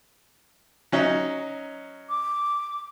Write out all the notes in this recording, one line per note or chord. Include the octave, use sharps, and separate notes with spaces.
F#3 C#4 D#4
D6